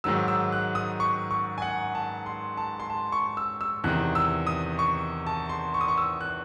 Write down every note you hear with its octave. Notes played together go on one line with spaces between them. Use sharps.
G#2 D#3 F#3 E6
E6
F#6
D#6
C#6
C#6
G#5
F#5
A5
C6
A5
C6
A5
C#6
E6
E6
E2 C3 D#3 F#6
E6
D#6
C#6
A5
C6
C#6
D#6
C#6
E6
F#6